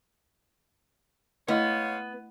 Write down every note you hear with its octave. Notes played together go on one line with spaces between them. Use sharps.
G#3 A3 B3 E4 C#5 D#5 F5